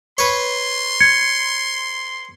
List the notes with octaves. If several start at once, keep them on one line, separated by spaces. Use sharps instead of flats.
B4 C#5 C6
G#6 C#7